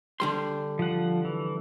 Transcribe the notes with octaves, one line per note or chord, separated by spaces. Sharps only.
D3 G3 C6
F3 F#5
E3